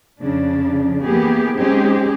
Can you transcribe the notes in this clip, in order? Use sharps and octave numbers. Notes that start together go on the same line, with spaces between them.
F2 C#3 D4
E3 A#3 B3 G4 G#4
G#3 C4 C#4 D#4 G4 G#4